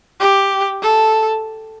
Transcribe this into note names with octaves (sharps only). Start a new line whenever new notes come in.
G4
A4